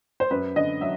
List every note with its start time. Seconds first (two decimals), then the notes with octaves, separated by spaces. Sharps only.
0.20 C5
0.31 F#2 B4
0.56 D3 D#5
0.81 F#3 E5